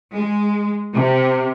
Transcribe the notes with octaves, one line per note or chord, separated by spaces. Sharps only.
G#3
C3